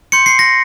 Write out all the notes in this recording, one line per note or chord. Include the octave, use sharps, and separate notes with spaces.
C6 G6 C#7
C7
A#6